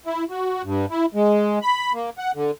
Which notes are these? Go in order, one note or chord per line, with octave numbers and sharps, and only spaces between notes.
E4
F#4
G2
E4
G#3
B5
A#3
F#5
D3